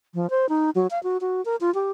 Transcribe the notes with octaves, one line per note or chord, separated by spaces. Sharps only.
F3
C5
D#4
F#3
F5
F#4
F#4
A#4
F4
G4